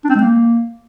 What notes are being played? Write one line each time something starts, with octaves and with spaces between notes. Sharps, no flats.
D4
C4
G#3
A#3